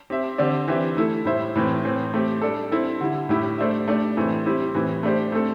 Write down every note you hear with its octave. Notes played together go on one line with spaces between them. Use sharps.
C4 G4 E5
D3 C4 G4 D5
E3 C4 G4 E5
A3 E4 A4
A2 G3 E4 C5 E5
A2 E3 C4
A2 E3 C4
A3 C4 G4
G3 D4 A4
C4 E4 A4
D3 G3 E4
A2 G3 E4 G4
A3 D4 C5 E5
A3 D4 G4 D5
A2 E3 A3 C4
G3 C4 E4 G4
A2 E3 C4 E4
A3 D4 G4 C5
A3 C4 A4